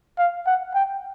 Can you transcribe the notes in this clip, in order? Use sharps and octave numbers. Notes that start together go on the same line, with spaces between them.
F5
F#5
G5